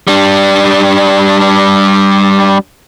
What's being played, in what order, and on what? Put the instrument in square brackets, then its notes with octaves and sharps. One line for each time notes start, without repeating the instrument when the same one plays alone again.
[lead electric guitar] G3 D4